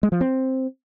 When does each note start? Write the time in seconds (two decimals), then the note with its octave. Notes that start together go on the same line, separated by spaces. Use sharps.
0.03 G#3
0.12 F3
0.21 C4